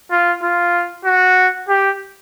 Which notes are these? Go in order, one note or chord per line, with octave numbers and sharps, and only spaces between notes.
F4
F4
F#4
G4